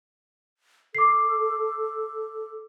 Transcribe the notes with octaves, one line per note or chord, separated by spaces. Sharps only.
A4 D6 C7